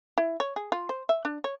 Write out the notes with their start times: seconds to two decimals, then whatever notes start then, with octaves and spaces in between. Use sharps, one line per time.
0.18 E4
0.40 C#5
0.56 G#4
0.72 F4
0.89 C5
1.09 E5
1.25 D4
1.44 C#5